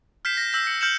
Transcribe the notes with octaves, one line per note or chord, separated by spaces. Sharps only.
F6 G6 B6 C7 E7
A#6
E6 G6 A#6 B6
C#7
F6 G6 C#7 E7 F#7